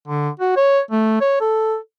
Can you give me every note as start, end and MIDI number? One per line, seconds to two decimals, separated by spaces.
0.08 0.29 50
0.40 0.53 66
0.56 0.80 73
0.91 1.20 57
1.21 1.37 73
1.41 1.76 69